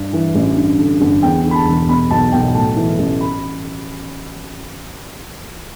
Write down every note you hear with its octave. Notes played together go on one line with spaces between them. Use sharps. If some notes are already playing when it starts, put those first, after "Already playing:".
Already playing: G2
E3
A1
G2
D3
G1
E2 G5
D3
B5
A5
E1
B2 B5
B1 A5
B1 G5
A2 A5
E3
A1
B5